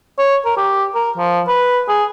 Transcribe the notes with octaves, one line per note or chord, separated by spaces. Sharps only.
C#5
A#4
G4
A#4
F3
B4
G#4